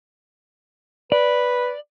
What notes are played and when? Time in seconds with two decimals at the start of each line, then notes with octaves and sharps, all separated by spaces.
1.12 B4 D5